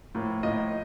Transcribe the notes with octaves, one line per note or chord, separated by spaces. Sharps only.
A2 F3 A#3
A2 F3 A#3 D#5